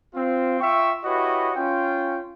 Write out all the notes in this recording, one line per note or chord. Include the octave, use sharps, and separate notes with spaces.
C4 F4
F4 E5 G5 C#6
E4 F#4 G4 B4 C#5 D#5
C#4 F4 G5